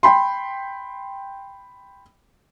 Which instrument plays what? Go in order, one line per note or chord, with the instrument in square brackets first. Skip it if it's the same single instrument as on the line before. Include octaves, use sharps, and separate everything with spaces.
[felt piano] G5 B5 C6